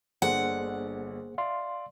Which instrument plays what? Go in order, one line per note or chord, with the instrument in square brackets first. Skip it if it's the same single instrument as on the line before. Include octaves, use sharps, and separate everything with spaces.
[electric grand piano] G1 D3 D5 [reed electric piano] A#3 G#4 C5 [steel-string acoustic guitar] F#5
[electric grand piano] D5 E5 [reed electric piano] F5 C6